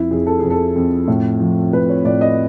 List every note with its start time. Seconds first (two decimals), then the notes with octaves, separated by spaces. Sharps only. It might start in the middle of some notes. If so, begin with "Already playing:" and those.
Already playing: F2 E4
0.11 F2 G#4
0.26 A4
0.39 F2 G#4
0.50 A4
0.76 F2
1.08 A2
1.40 F3
1.73 A2 B4
1.89 C#5
2.04 A2 D5
2.21 D#5